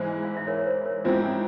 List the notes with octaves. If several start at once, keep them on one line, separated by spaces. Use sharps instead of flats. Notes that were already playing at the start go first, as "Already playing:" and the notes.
Already playing: G#2 E3 G#3 E4 C5
F5
E5
A#4 C#5
C#5
C5 E5
A#4 C#5
G#2 F3 C4 E4 C5 E5